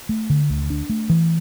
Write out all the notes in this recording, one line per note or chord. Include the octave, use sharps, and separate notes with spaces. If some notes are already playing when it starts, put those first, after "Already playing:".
A3
D3
D2
D4
A3
E3